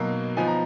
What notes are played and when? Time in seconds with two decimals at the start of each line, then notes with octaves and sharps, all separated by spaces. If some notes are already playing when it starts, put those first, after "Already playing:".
Already playing: B2 F#3 A#3 D#4
0.37 F3 B3 D#4 G#5
0.47 A#5